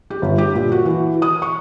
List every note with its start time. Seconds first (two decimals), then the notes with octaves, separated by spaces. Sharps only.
0.10 G4
0.22 G1
0.38 G4
0.55 A#2
0.72 F#4
0.85 E3
1.22 D#6
1.42 C#6